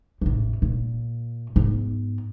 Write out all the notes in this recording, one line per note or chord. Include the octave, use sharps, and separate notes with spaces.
A1 E2
A#2
G#2 B3